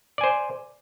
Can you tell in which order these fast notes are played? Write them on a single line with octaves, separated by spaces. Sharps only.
D5 G#5 C5